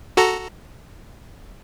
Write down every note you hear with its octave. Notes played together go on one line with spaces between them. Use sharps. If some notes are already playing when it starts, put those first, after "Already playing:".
F#4 A4 A#5